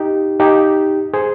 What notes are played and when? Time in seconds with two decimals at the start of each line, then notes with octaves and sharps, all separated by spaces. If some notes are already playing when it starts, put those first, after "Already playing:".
Already playing: D#4 G4
0.40 D#4 G4
1.14 G#4 C5